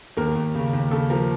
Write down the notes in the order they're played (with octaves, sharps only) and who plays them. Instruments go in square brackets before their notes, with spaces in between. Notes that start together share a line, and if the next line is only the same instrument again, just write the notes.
[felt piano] D#2 A#4
D#2
C#3
D#2
C#3 A4
F3 A#4